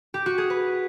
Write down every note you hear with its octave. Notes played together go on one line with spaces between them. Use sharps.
G4
F#4
G#4
B4